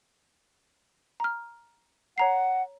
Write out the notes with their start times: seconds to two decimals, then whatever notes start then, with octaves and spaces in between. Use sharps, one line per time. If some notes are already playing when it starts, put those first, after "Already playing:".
1.20 A#5 F6
2.18 C#5 F#5 A#5 C7